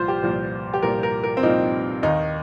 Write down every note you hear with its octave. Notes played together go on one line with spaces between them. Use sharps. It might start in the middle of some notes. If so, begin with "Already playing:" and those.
Already playing: C2 A#2 F3 F4 C5
G4
C2 A#2 F3
G4
C2 A#2 F3 A#4
A#4
A#4
C4
C2 A#2 F3 D#4
D#2 D#3 D#4